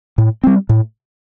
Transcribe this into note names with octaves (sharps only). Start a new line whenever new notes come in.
A2
G3 C4
A2